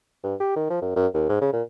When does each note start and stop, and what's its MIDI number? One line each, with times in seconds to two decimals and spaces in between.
0.24 0.35 43
0.40 0.56 67
0.56 0.66 51
0.70 0.78 53
0.82 0.95 42
0.96 1.07 42
1.14 1.29 39
1.29 1.40 44
1.41 1.52 49
1.53 1.62 46